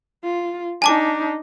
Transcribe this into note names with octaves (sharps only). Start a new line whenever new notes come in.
F4
D4 D#4 G#5 A5 D6